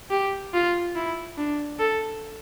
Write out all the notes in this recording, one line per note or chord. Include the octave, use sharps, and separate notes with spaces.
G4
F4
E4
D4
A4